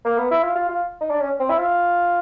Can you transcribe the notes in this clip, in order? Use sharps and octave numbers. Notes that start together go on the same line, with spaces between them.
A#3
B3
E4
F4
F4
F4
D#4
D4
C#4
C4
E4
F4